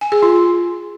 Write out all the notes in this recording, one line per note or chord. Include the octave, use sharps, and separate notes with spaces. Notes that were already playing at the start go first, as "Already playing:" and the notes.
G#5
G#4
F4